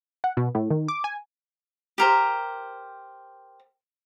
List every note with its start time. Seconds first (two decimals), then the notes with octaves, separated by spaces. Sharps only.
0.24 F#5
0.37 B2
0.55 A2
0.70 D#3
0.88 D6
1.04 G#5
1.98 G4 A#4 C5